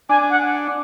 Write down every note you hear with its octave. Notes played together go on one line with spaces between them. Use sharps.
D4 G#5
F#5